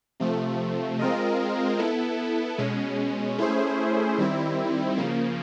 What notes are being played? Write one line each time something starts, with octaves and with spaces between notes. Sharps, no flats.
C3 F3 A3
G#3 C4 F4 A#4 D#5
B3 E4 A4
B2 G#3 C#4
A3 C#4 E4 G#4 C5
D#3 G3 C4 E4
C#3 F3 A#3